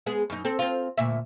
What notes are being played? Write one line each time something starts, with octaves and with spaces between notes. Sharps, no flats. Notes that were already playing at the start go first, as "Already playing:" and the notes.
G#3 B3 G#4
F#2 D#4
C4 A4
C4 F4
D2 A#2 E5